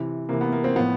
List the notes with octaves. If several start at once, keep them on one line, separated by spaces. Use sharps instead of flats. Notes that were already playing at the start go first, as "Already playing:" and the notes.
Already playing: C3 E3
C3 E3 A#3
B3
A#3
A#3 C4
A2 F3 B3